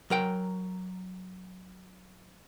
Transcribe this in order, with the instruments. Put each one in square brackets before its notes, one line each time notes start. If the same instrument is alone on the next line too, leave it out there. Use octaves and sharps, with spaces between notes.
[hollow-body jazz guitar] F#3 A#4 G5